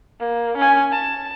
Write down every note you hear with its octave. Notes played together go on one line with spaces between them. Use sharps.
A#3
C#4 G#5
A5